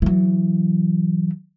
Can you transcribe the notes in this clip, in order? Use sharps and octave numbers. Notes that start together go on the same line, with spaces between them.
E3 F#3